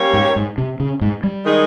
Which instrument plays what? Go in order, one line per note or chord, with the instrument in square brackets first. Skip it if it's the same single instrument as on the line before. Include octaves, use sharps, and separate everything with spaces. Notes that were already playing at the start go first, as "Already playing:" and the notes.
Already playing: [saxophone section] G3 A#3 C#4 G4 C#5
[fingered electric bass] G#2
G#2
C3
C#3
G#2
G3
[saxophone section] D#3 G#3 D#4 G#4